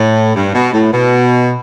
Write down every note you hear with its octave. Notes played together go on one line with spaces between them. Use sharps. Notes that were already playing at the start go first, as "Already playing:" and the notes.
Already playing: A2
G2
B2
A2
B2